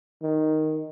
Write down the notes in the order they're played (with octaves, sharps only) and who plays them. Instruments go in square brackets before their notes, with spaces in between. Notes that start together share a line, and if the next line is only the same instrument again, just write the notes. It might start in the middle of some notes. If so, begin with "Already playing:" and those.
[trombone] D#3